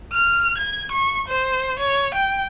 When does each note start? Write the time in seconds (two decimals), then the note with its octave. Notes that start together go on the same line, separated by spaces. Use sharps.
0.13 F6
0.58 G#6
0.92 C#6
1.28 C5
1.79 C#5
2.14 G5